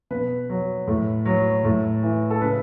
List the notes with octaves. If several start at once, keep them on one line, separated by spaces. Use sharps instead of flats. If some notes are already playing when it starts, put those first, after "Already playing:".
B2 B4
F#3
A2
F#3
A2
E3
A4
C#3 B4